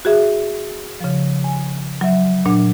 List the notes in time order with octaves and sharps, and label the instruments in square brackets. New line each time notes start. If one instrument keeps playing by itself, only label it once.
[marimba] F#4 G#4 E5
C#3 F3
G#5
F#3 E5
A#2 F#3 D4